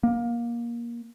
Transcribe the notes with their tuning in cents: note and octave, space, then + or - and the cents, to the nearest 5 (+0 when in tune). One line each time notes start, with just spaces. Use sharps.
A#3 +20